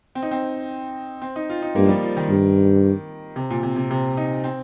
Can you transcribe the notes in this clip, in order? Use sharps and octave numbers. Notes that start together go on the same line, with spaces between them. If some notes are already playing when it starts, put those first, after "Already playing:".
C4
D#4
C4
C4
D#4
F4
D#4
G2 A#3
F3
G3
F3
D#3
G2
C3
A#2
C3
C3
C3
D#4
C4